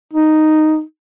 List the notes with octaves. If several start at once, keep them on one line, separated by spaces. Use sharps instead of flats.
D#4